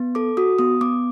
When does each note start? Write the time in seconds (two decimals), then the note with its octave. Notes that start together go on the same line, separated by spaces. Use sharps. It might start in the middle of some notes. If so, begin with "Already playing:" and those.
Already playing: B3
0.15 A4 D6
0.37 F#4 D#6
0.59 B3 D#6
0.81 B3 D6